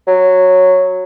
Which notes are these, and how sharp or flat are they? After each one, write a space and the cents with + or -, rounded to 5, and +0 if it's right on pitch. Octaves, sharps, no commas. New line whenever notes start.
F#3 -5